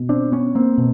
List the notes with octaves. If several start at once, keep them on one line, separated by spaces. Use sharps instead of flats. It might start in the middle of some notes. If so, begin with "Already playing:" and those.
Already playing: B2
C4 D4
B3 C#4
A#3 C4
B2